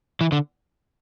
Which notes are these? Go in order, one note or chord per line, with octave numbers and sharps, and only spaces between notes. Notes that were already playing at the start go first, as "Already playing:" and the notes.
E3
D3